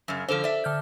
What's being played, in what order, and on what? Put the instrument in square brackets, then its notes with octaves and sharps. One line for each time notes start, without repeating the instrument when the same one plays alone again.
[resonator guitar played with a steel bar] F#2 C#3
[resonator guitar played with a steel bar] D3 F3 [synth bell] A4 C5
[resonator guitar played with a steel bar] D5 E5
[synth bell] D3 F6 G6